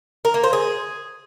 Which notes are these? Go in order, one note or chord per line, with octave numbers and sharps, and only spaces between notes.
A#4
A#3
C5
G#4